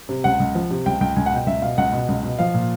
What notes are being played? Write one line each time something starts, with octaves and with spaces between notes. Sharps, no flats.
C3
C#2 F#5
C#2
F3
C3
C#2 G5
C#2 G5
C#2 G#5
F#5
B2 G5
C#2 E5
B2 F5
C#2 F#5
B2
C#2
B2
F3 F5
A#2